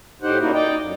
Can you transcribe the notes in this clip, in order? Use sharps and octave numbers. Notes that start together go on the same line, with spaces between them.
A2 D#4 G4 C5 F#5
A#2 C#3 A#3 D#4 E4 F#4
D#4 D5 D#5 G5
F#2